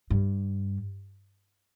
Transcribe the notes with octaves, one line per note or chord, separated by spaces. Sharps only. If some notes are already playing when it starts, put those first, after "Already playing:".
G2